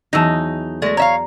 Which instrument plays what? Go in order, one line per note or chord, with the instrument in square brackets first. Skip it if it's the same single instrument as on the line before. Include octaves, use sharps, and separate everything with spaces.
[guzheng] E2 F#3 [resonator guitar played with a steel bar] D#4 [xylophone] A5 E6 A#6
[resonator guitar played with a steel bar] G#3 A3 [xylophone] D5 A#6
[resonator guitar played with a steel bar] C#5 E5 F5 [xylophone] A#5